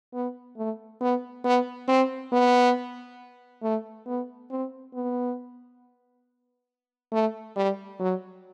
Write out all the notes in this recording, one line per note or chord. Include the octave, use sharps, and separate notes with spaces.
B3
A3
B3
B3
C4
B3
A3
B3
C4
B3
A3
G3
F#3